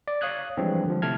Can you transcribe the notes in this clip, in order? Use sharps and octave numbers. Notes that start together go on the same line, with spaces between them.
D5
C#5 F5 D#6 F#6 G#6
E3 F3 G3 G#3 C4 D4
D3 F3
C3 A3 E4 A5 F6 G#6